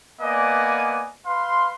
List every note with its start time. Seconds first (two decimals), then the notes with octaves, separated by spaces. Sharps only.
0.20 A#3 B3 D5 D#5 G#5
1.26 B4 F5 C6